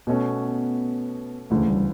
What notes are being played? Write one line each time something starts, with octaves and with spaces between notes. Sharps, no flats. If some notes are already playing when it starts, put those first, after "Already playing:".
B2 A3 B3 C#4 F#4
E1 D2 C#3 E3 A3
G3